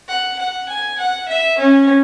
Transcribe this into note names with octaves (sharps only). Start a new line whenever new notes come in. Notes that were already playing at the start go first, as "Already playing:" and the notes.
F#5
F#5
G#5
F#5
E5
C#4